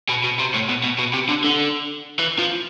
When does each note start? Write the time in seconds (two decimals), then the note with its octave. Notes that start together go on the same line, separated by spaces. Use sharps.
0.09 B2
0.24 B2
0.39 C3
0.54 A2
0.69 B2
0.84 B2
0.99 B2
1.13 C3
1.29 D3
1.44 D3
2.19 E3
2.39 F3